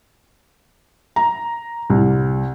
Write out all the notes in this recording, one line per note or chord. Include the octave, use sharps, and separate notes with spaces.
A#5
C2